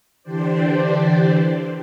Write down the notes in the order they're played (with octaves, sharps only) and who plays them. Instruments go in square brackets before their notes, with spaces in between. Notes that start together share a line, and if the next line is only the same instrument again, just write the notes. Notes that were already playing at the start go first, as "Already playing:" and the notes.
[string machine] D3 E3 D4 G4 C5 D5